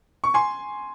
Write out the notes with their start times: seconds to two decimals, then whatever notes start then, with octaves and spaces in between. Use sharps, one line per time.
0.24 C#6
0.34 G#5 C6